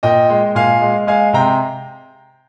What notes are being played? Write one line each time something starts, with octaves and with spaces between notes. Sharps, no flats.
A#2 D#5 G5
G#3
A#2 F5 G#5
G#3
G#3 F5 G#5
C3 G5 A#5